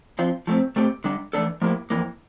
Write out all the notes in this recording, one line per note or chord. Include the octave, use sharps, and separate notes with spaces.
F3 C4 F4
F3 A3 C4
A#2 A3 C4 G4
D3 G3 D4
E3 A3 D4 A4
A2 F3 A#3 E4 G4
F2 E3 A#3